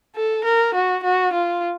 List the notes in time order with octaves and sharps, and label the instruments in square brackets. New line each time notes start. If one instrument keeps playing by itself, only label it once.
[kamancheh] A4
A#4
F#4
F#4
F4